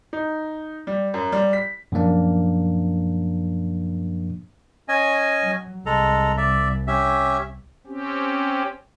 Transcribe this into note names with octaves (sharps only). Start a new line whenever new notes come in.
D#4
G3
F#2
G3
B6
F#2 A#2 F3 A#3 D4
C#4 D#5 G#5
F#3
C2 G#3 A4 A#5
D5 E5
C#4 G4 E5
C4 C#4 G4